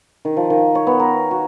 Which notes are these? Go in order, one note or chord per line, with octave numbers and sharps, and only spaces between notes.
D#3
F3
D#3
C#5
B3
A#4
F#4